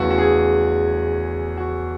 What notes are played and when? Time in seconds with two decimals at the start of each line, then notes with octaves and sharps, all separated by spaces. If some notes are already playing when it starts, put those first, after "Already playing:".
Already playing: E2 C#3 E3 A3 F#4
0.10 F#4
0.18 G#4
1.57 F#4